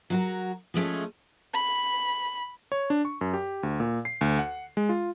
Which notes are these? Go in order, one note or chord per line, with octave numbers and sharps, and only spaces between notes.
F#3 F#4 A#4
F3 G#3 A3 C#4
B5
C#5
D4
C#6
F#2
G4
D2
A#2
C7
D2
F#5
G#3
F4